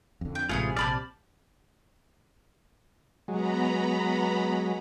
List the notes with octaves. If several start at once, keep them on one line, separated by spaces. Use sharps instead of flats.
F2 D3
G5
A1 G#2 C3 A3 B3 F4 G#4 G#5
A#1 C3 G4 D5 A5 B5 F6
F#3 G#3 B3 A#5 B5